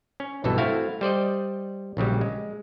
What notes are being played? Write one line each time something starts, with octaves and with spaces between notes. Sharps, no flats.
C#4
B1 G2 B2 E3 A4
A3 C4 E4 F#4 F5
G3 C5 D5 D#5
A#1 C#3 F#3 G3
G#3